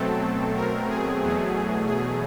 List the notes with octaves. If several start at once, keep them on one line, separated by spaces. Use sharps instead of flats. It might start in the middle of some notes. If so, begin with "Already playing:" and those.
Already playing: B2 F#3 A3 C4 A4
A#4
G#4
E2 B2 F#3 A3
G#4